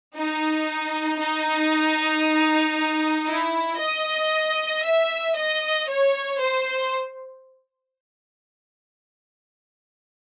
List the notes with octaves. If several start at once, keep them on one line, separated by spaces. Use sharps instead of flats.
D#4
D#4
E4
D#5
E5
D#5
C#5
C5